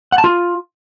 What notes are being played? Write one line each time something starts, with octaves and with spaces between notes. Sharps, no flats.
F#5
A5
F4